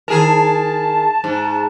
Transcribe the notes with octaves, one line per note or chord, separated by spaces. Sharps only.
D#3 G#4 A#4 A5
G#2